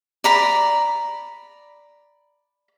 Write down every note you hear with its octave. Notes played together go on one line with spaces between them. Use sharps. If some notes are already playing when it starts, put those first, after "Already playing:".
D5 A#5 B5